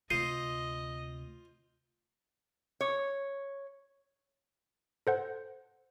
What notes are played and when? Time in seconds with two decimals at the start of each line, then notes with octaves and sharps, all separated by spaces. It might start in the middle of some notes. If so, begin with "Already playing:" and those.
0.10 D2 C3 F4 C5 D#5 C7 D#7
2.81 C#5
5.07 A4 C5 F#5